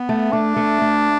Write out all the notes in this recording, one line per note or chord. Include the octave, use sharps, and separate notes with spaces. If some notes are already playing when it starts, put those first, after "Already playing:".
Already playing: B3
A3
A3 D4
A3
A3